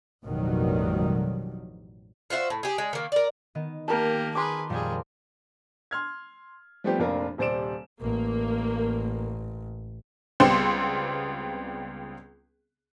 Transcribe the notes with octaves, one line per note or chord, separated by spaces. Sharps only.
A1 F2 B2 D#3 F#3 G3
F4 F#4 C5 E5
A2
G4 G#4
G#3
D#3 A#3
A#4 D5
D#3 B3 D#5
A#3 G4 A#4 A5
G#4 B4 C6 D6
F2 A#2 G3 G#4
C6 F6 G#6
F3 G3 A3 B3 C4 G4
F1 F2 A#2 D4 F4 A#4
D#1 C3 C5 D5 D7 E7
A1 A#3
C#2 G3 B3 C4 C6 E7